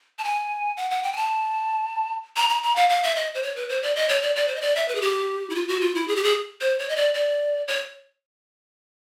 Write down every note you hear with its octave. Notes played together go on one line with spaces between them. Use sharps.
A5
G#5
F#5
F#5
G5
G#5
A5
A#5
A#5
A#5
F5
F5
E5
D#5
C5
C#5
B4
C5
D5
D#5
C#5
D5
D5
C5
D#5
D5
E5
B4
G#4
G4
E4
F4
F#4
F4
E4
G#4
G4
G#4
C5
C#5
D#5
D5
D5
C#5